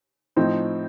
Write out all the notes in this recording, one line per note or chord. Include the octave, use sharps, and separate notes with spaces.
A2 F3 C4 D#4